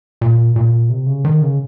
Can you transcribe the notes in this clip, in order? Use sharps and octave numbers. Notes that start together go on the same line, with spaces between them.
A#2
A#2
C3
C#3
D#3
C#3